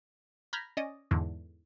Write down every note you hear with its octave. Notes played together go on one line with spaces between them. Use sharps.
A#5 B5 F6 G6 G#6
C#4 D5 D#5
E2 G#2 D3 E3